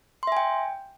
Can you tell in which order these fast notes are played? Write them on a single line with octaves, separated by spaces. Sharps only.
C6 E5 G#5 G5